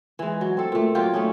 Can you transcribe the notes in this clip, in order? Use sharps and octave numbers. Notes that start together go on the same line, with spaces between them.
E3 G#3
F#3
C4 A4
A#2 A3
F#3 A#3 F4 G4
A3 C#4 D#4